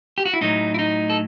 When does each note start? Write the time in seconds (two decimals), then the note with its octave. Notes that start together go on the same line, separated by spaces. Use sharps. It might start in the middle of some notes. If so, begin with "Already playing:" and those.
0.18 G4
0.26 F#4
0.33 E4
0.41 A2 F#3 A3 D#4
0.74 E4
0.79 D#4
1.10 A4